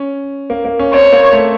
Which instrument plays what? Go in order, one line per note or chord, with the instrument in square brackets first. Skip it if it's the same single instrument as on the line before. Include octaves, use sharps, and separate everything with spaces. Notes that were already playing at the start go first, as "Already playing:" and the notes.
Already playing: [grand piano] C#4
A#3
A#3
C#4
[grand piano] C4 [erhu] C#5
[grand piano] A#3
A3